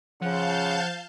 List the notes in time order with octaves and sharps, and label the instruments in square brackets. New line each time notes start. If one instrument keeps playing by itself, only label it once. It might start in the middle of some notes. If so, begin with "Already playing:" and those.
[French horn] C#3 [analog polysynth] F3 [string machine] F5 A5 G6 [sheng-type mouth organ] F#5